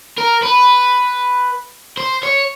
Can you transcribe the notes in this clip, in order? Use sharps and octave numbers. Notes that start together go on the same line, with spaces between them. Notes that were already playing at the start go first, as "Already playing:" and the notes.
A#4
B4
C5
C#5